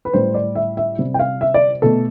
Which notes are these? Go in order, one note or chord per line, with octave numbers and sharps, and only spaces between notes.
B4
A2 G3 C5
D5
E5
E5
C3 G3
G5
F5
E5
D5
B2 A3 A4